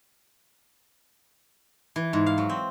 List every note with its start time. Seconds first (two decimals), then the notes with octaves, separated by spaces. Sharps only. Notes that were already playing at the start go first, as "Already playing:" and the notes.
1.96 E3
2.13 G#2
2.26 F5
2.38 F#3
2.49 C4